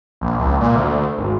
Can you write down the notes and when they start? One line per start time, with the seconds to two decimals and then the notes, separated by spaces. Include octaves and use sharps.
0.21 A#1
0.39 C#2
0.61 A#2
0.76 D2
1.18 G#1